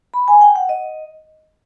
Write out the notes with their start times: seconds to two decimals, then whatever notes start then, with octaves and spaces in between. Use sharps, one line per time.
0.14 B5
0.28 G#5
0.41 G5
0.56 F#5
0.69 D#5